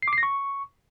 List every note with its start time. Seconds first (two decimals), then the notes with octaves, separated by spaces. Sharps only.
0.03 C7
0.08 D6
0.13 C7
0.18 A#6
0.23 C#6